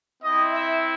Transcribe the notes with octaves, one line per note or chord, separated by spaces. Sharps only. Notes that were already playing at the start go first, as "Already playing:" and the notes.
C4 E4 D#5
E5